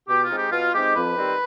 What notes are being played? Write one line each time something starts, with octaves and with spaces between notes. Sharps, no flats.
B2 G4
F4
G#3 C4 D#4
G4
B2 F4
G#3 C4 D#4 G4
F2 B4
D#3 G3 C4